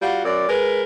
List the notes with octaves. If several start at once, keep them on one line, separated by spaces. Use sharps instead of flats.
G3 F4 F#4
F#2 D5
G#3 A#4 B4